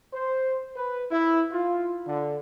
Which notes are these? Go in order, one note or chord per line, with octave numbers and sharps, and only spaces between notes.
C5
B4
E4
F4
D3